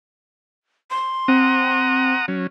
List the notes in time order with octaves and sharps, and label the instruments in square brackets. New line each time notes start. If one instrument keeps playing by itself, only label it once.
[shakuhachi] C6
[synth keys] C4 [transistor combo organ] F#5 A#5 D#6
[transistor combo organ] F#3 C#4